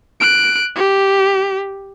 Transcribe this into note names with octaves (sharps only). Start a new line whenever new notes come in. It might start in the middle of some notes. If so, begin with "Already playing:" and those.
F#6 D7
G4